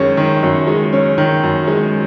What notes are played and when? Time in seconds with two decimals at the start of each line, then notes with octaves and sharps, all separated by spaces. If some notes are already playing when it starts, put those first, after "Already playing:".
Already playing: F#2 D#3 G#3 C#4
0.17 D#3
0.43 F#2
0.67 G#3
0.93 C#4
1.18 D#3
1.43 F#2
1.68 G#3